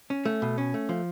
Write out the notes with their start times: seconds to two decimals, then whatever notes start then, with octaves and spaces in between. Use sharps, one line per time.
0.10 C#4
0.25 A3
0.42 B2
0.58 C#4
0.74 A3
0.89 F3